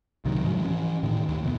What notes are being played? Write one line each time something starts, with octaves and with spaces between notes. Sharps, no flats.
C2 C3 D#3 F#3
G#2 F3 F#3
E3 C#4
A2 D3 D#3
D#2
F2 B2 B3